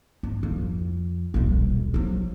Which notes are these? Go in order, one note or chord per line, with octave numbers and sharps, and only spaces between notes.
G#2
F2
D#1 B1
F3 F#3